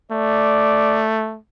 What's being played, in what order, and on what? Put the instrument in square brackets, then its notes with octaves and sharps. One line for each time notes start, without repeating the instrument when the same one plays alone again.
[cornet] A3 [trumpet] D5